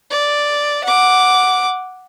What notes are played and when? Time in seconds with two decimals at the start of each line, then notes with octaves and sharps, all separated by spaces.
0.11 D5
0.84 F#5 D6